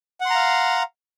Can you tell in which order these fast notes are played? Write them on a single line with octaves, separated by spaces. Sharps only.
F#5 C6 A#5 F5